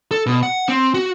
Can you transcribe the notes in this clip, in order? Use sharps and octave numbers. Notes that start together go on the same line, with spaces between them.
A4
B2
F#5
C4
F#4